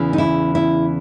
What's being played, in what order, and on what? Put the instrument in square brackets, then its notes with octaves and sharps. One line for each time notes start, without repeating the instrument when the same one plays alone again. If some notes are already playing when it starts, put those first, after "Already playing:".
Already playing: [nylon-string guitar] E2 C#3 E3
D#4
E4
E4